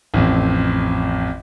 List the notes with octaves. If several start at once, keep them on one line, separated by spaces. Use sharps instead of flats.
A1 F2